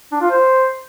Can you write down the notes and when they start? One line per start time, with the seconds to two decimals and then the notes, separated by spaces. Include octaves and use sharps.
0.11 D4
0.21 F4
0.31 C5